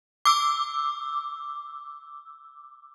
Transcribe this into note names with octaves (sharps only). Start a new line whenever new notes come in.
D6 E6